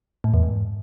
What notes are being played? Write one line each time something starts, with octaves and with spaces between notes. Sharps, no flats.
A2
E2
G#2